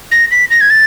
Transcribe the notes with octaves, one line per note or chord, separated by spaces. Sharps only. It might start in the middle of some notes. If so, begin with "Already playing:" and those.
A#6
B6
A#6
G#6
A6